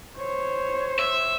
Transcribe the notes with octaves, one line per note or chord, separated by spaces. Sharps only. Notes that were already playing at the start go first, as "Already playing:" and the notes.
C5 C#5
E5